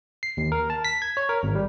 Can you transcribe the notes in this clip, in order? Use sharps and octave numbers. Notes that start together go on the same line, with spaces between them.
C7
D#2
A#4
A5
B6
G#6
C#5
A#4
G#1
G3